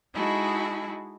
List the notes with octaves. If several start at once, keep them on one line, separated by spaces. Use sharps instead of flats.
G#3 D#4 E4 F#4 G#4 A4